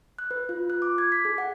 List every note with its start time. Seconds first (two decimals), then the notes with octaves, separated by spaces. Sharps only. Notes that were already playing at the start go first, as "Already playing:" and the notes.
0.19 F#6
0.31 B4
0.49 F4
0.70 F#6
0.82 D6
0.98 G#6
1.12 B6
1.25 G#4
1.38 F#5